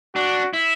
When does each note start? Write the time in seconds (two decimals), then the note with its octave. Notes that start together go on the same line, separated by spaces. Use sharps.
0.16 D4 F#4
0.53 E4